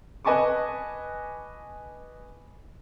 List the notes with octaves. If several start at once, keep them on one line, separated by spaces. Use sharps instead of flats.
B4 D#5 G#5 A5 C#6 D6